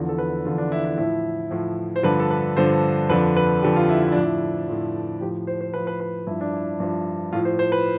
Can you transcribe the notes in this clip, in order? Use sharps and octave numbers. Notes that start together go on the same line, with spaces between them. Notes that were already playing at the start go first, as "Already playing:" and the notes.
Already playing: E2 D3 F3
A4
B4
E2 D3 F3 F4
D4
E4
E4
A2 F3 E4
A2 F3
C5
G2 D3 F3 B4
A4
B4
G2 D3 F3 C5
F2 D3 F3 B4
B4
F2 D3 F3 G4
F4
E4
E4
A2 F3 D4
E4
A2 F3
A2 F3 G4
C5
C5
A2 F3 B4
B4
B4
G2 F3 E4
D4
E4
G2 F3
A2 F3 F4
C5
C5
B4